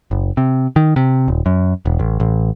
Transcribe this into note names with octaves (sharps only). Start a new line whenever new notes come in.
F#1
C3
D#3
C3
D#1
F#2
E1
A1
A1